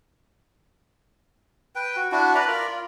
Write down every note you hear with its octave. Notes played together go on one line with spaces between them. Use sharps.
B4 G5
F#4
D4 E4 F#4
B4 D5 A#5 B5
F4 A#4 D5 B5
F4